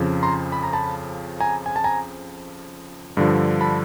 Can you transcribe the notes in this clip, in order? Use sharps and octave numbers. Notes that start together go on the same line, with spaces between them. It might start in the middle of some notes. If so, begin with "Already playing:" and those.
Already playing: F2 C#3 F3
A#5 C6
B5
A#5
A5 B5
G#5 A#5
G#5
A5
G#5 A#5
G2 D3 F3
A5 B5